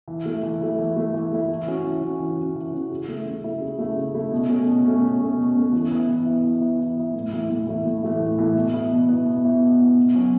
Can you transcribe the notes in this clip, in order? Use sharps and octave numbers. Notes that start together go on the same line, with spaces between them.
E3
A3 E4
E3
A3 E4
E3
A3 E4
E3
A3 E4
E3
C#4 F#4
E3
C#4 F#4
E3
C#4 F#4
E3
C#4 F#4
C#3
A3 E4
C#3
A3 E4
C#3
A3 E4
C#3
A3 E4
B2
A3 C#4
B2
A3 C#4
B2
A3 C#4
B2
A3 C#4
E3
B3 E4
E3
B3 E4
E3
B3 E4
E3
B3 E4
A2
E3 A3 E4
A2
E3 A3 E4
A2
E3 A3 E4
A2
E3 A3 E4
B2
B3 E4
B2
B3 E4
B2
B3 E4
B2
B3 E4
B2
F#3 C#4 F#4